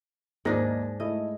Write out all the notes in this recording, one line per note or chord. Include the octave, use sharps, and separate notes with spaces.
D#2 G#2 A#3 D4 G#4 A#6
A3 E4 D#5